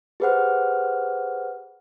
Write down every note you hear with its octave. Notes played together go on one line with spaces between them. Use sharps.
G4 G#4 B4 C5 F#5 F6